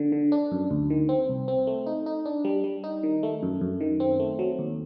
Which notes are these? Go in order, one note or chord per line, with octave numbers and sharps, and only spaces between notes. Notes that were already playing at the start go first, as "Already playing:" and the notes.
Already playing: D3
D3
D4
F#2
D2
D#3
C4
C2
C4
A3
D#4
D#4
D4
G3
G3
D#4
D#3
A3
F#2
F#2
D#3
C4
A3
F#3
D#2